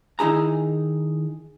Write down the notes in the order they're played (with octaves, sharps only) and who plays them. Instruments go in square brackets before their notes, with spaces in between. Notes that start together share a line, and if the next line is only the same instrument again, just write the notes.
[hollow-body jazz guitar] D#3 D#4 E4 G#4 A#5